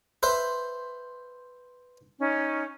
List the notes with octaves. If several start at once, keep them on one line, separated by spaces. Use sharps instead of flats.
B4 C5 E5
C#4 D#4